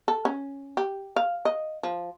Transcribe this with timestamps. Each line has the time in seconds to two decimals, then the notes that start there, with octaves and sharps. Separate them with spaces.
0.08 A4
0.25 C#4
0.77 G4
1.16 F5
1.45 D#5
1.83 F3